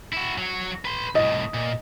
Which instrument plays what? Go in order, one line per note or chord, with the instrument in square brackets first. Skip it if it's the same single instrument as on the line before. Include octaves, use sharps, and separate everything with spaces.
[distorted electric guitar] E4 F#4
F#3 C#5
B4 C6
[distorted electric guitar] C2 A2 [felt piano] D#5
[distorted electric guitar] A#2